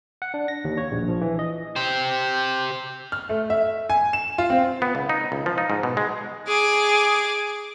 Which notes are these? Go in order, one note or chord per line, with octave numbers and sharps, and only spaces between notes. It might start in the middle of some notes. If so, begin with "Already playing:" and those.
F#5
D4
A#6
D#2
C#5
A#1
F3
E3
D#5
G4 C5
F6
A3
E5
G#5
E7
F4
C4
B3
C#2
D#4
C#2
F3
D#4
G#2
B2
G#3
G#4 D6